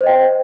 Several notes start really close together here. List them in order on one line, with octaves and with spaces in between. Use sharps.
C5 D#5 G5